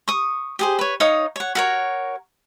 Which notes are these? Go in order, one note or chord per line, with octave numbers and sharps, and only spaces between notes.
C#6 D#6
G4 G#4 C5
B4 C#5
D#4 C#5 F5 D#6
C#5 F#5
F#4 A#4 C#5